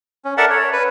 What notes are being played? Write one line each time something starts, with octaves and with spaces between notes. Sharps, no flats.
C#4
A4 A#4 D5 E5 F#5 A5
C#5
B4